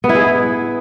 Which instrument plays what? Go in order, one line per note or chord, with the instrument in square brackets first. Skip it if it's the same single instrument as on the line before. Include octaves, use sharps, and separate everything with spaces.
[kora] B3
E4
G#4